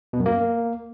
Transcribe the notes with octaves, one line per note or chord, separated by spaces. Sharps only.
B2
F#2
A#3